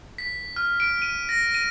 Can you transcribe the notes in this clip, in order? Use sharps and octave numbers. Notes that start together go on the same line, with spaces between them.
B6
F6
D7
D#7
A#6
D#7